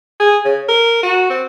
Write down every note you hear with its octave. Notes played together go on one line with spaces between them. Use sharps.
G#4
C#3
A#4
F#4
C4